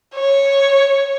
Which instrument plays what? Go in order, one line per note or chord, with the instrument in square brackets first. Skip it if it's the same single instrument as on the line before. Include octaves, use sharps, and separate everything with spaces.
[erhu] C#5